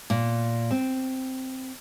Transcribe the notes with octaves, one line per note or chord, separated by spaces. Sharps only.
A#2
C4